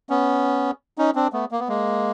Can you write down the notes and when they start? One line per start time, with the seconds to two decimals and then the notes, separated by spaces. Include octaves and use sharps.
0.10 B3 C#4
0.98 C#4 D#4
1.15 C4 D4
1.33 A3 B3
1.51 A#3
1.60 B3
1.68 G#3 A#3